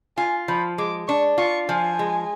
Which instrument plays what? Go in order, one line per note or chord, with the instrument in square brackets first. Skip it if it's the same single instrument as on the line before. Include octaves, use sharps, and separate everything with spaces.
[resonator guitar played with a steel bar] F4 [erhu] G#5
[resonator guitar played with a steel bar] F3 [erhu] B5
[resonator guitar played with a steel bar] G#3 [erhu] D6
[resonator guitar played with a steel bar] D4 [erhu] C#6
[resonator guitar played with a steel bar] F4 [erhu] C#6
[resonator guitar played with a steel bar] F3 [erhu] G#5
[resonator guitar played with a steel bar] G#3